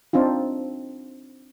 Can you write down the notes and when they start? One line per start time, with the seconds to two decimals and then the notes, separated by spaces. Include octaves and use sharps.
0.13 C4 D4 D#4 F4